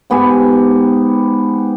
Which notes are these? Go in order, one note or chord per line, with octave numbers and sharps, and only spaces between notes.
G#2 B3 G4 G#5